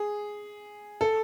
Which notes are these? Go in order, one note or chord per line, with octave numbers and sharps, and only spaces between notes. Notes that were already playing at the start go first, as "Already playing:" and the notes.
Already playing: G#4
A4